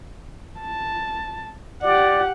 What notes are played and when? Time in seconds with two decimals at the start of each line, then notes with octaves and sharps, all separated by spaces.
0.60 A5
1.82 G4 D5 F#5